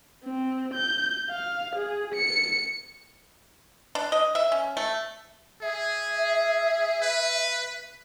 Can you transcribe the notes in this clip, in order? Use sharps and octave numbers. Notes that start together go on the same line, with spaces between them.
C4
G6
F5
G#4
C#7
D4
D#5
E5
C#4
A3
G#4 E5
B4